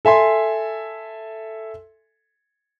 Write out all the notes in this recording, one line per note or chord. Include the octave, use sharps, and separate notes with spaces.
A4 E5 G#5 C6